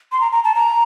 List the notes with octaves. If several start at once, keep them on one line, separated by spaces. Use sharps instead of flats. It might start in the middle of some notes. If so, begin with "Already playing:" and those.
C6
A#5
A#5
A5
A#5